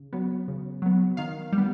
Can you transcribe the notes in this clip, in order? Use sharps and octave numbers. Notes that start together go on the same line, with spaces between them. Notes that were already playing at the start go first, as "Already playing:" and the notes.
Already playing: C#3
F#3 B3
C#3
F#3 B3
D#3 F5
G3
B3